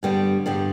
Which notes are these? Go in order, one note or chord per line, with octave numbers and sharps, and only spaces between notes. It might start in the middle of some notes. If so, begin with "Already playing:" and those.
G2 D3 G3 B3 D4
G2 D3 G3 B3 D4